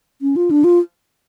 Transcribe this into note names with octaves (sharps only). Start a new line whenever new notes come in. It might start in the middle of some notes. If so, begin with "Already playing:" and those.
C#4
F4
D4
F4